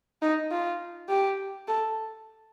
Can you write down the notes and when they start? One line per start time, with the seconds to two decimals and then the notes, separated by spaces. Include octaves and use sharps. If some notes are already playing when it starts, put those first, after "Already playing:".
0.22 D#4
0.51 F4
1.09 G4
1.68 A4